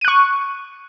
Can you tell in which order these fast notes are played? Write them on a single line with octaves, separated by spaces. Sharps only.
D#7 F#6 C#6